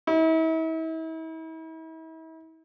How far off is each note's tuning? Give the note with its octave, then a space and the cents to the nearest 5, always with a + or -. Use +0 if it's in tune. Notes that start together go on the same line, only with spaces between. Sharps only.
E4 -40